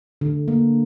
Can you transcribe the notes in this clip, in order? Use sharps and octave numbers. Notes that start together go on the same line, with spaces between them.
D3
A#3